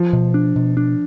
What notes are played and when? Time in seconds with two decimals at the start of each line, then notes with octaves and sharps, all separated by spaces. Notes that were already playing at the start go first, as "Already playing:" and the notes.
Already playing: F3
0.13 B2
0.34 D4
0.56 B2
0.77 D4